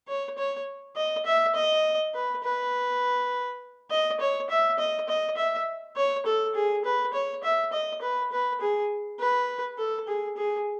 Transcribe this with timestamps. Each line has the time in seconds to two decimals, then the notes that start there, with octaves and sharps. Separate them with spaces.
0.08 C#5
0.38 C#5
0.96 D#5
1.26 E5
1.55 D#5
2.14 B4
2.43 B4
3.90 D#5
4.20 C#5
4.50 E5
4.79 D#5
5.09 D#5
5.37 E5
5.96 C#5
6.26 A4
6.55 G#4
6.85 B4
7.14 C#5
7.43 E5
7.72 D#5
8.01 B4
8.32 B4
8.61 G#4
9.20 B4
9.78 A4
10.08 G#4
10.37 G#4